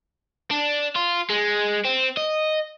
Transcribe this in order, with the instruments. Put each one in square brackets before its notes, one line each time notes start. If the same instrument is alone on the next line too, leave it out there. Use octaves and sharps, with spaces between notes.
[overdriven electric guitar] D4
F4
G#3
C4
D#5